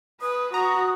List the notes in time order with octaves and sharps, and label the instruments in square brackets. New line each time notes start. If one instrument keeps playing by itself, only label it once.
[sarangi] B4 [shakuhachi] D#6
[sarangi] F#4 [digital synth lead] A#5 [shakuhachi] D#6